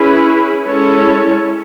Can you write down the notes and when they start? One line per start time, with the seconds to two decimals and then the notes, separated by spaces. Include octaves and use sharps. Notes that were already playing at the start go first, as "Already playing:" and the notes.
Already playing: C#4 E4 G#4 B4
0.65 G#3 C#4 E4 A4 C#5